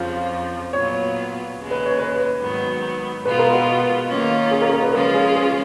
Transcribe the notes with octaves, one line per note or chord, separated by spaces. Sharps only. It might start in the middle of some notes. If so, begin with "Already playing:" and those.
Already playing: F2 C#3 F3 F4
A#2 F#3 B3 F4 C#5
D#2 C#3 G#3
B4
C#5
B4
G#2 D#3 F#3 B3
B2 G#3 B3 F4 B4
A#4
F#4
D#3 A#3 C#4 F4
G#4
A#4
A#4
B4
C#3 F3 G#3 C#4 F4 A#4
G#4
G#4